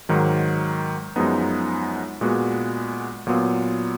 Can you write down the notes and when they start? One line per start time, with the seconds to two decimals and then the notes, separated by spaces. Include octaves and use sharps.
0.09 G#2 D#3 F#3
1.16 F#2 F3 G#3 B3 D#4
2.21 A#2 G#3 B3 F#4
3.27 A#2 F#3 B3 F4